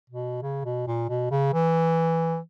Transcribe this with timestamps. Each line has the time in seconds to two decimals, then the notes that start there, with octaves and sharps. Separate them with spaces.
0.10 B2
0.42 C#3
0.65 B2
0.87 A#2
1.09 B2
1.31 C#3
1.53 E3